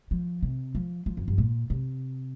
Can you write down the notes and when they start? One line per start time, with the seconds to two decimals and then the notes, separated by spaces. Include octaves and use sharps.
0.11 F3
0.43 C3
0.75 F3
1.06 F3
1.17 F2
1.28 G2
1.38 A#2
1.70 C3